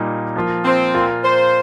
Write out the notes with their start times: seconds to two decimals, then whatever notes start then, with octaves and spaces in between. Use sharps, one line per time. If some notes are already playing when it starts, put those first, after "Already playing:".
Already playing: A#2 G3 A#3 D#4
0.36 F3 A#3 F4
0.65 C4
0.94 A#2 A#3 F4
1.24 C5